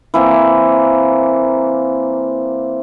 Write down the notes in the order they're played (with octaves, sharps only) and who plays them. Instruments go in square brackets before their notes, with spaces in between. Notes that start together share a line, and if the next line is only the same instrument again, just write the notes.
[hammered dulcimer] E3 A#3 C4